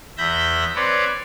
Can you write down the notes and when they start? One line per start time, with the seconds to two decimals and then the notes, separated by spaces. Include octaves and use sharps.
0.17 E2 E5 B5 G6 A#6
0.76 C4 B4 C#5 D5